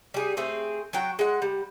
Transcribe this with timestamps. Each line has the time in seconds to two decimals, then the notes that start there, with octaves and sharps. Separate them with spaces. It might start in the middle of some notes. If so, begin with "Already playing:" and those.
0.14 G3 G#4
0.37 A3 C4 G#4
0.93 F#3 F#4 G5
1.19 G#3 F#5
1.42 G3